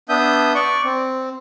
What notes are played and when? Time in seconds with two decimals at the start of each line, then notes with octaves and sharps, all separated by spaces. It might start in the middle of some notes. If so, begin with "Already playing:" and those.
0.09 B3 D4 E5 D#6 G6
0.55 D5 C#6
0.84 C4